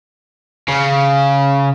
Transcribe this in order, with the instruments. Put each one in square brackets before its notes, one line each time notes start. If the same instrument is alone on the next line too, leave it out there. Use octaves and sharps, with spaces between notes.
[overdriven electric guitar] C#3